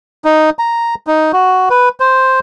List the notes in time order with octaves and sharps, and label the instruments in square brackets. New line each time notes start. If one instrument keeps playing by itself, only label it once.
[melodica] D#4
A#5
D#4
F#4
B4
C5